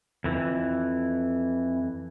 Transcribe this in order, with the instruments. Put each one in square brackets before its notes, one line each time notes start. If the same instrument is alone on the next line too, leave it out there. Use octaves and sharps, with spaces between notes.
[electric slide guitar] F2 E3